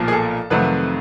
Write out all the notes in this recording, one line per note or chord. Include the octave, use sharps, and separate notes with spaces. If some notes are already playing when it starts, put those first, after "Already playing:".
Already playing: B1 A#2 F3 A#3
G#4
A4
F2 C3 D#3 F#3 A3 B4